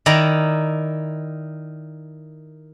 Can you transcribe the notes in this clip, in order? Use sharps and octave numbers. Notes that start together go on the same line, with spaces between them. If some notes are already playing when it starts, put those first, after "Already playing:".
D#3 E4 D5 A#5